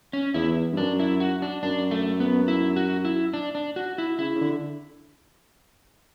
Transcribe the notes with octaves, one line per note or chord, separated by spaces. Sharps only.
C#4
E2 E4
G2
F#2 D4
E4
F#4
D4
F#2 D4
A3
B3
E4
F#4
E4
D4
D4
F#4
E4
C#3 E4
C#3
D3